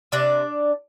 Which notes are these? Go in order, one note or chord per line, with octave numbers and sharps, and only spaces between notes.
C3 D4 D5